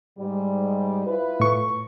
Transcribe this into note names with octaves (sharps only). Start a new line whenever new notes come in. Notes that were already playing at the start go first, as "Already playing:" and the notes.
G#2 G3
E4 F4 B4
A2 C#6